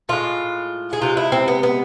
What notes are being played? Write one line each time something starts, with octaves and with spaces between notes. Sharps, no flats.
A2 G#3 F4
G#4
C3 E3 G#3 F4
E4
C4
B3
B3